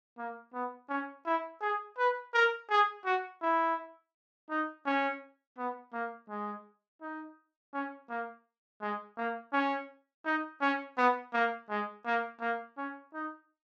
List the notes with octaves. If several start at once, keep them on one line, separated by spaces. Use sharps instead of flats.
A#3
B3
C#4
E4
G#4
B4
A#4
G#4
F#4
E4
D#4
C#4
B3
A#3
G#3
D#4
C#4
A#3
G#3
A#3
C#4
D#4
C#4
B3
A#3
G#3
A#3
A#3
C#4
D#4